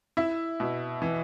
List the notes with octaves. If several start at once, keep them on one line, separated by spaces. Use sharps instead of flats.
E4 E5
B2
E3